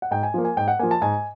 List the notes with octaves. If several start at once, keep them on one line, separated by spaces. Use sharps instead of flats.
F#5
G#2 G5
G#5
F3 A#3
G#5
G#2 G5
F#5
F3 A#3 G#5
A5
G#2 G#5